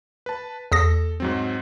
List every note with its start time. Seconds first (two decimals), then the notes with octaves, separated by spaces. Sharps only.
0.26 B4 A5
0.72 E2 A4 D#6 A#6
1.20 G#2 F#3 C4